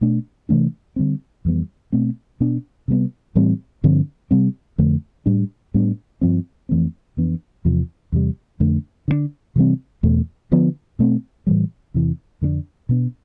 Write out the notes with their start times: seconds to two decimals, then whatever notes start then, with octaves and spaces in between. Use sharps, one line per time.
0.01 B2 A3 D4
0.49 C3 E3 A3 D4
0.96 D3 G3 C4
1.45 F2 E3 G3 B3
1.92 B2 A3 C4
2.40 B2 B3 D4
2.88 C3 G3 B3
3.35 A2 E3 G3 C4
3.84 G2 D3 F3 C4
4.31 C3 G3 C4
4.78 F2 D3 A3
5.26 A2 G3 D4
5.74 A2 G3 B3 D4
6.21 G2 F3 C4
6.69 F2 E3 A3 C4
7.17 F2 E3 B3 D4
7.65 E2 C3 F3
8.12 E2 C3 G3
8.60 F2 D3 A3
9.08 D3 G3 D4
9.56 C3 E3 G3 C4
10.03 E2 B2 A3
10.52 D3 F3 B3
10.99 B2 A3 C4
11.47 A2 E3 G3
11.94 E2 C3 E3
12.41 F2 D3 A3 D4
12.89 B2 B3 D4